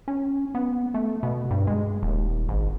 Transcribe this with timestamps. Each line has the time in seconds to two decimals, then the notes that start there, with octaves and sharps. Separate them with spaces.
0.08 C#4
0.55 B3
0.94 A3
1.23 B2
1.51 G2
1.67 G#3
2.03 D#1
2.49 G#1